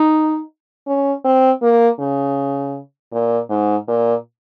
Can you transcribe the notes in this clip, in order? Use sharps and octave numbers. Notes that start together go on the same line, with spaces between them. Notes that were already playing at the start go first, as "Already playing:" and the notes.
Already playing: D#4
C#4
C4
A#3
C#3
A#2
G#2
A#2